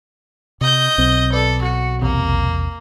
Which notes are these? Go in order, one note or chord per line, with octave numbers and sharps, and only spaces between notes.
C3 D#5 G6
B1 C4
A4 B4 D5
F#3 F#4 C#7
A#1 E2 C3 A#3